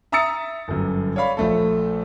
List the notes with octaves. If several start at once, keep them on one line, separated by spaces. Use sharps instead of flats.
E5 A#5 D#6 E6 A6 C#7
G1 F#2
C#5 D5 F5 B5
A#1 A3 A4